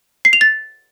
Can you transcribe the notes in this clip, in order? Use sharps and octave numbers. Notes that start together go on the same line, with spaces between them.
C7
F7
A6